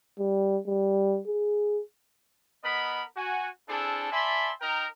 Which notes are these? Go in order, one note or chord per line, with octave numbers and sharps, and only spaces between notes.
G3
G3
G#4
B3 A#4 D#5 B5
F#4 G#5
C4 D4 E4 G#4 A4
D5 E5 G#5 A5 B5 C6
D#4 A#4 G5 A#5